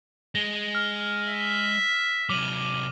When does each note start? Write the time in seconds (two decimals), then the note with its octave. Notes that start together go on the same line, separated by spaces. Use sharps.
0.35 G#3 A#6
0.75 F6
1.29 E5
2.29 C3 F#3 D6 D#7 F#7